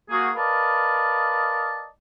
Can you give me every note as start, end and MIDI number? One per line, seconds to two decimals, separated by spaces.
0.10 0.29 58
0.10 0.29 66
0.10 0.29 68
0.36 1.88 70
0.36 1.88 71
0.36 1.88 74
0.36 1.88 75
0.36 1.88 77
0.36 1.88 81